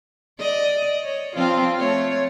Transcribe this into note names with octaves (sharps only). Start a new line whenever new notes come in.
D5 D#5
C#5
F3 C4 F4
A3 C#5